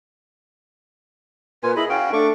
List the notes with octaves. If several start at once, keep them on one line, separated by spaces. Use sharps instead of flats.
A#2 F4 B4 G#5
E4 G#4 D#5 B5
C#4 F#4 F5 G5
A3 D4 C#6 D6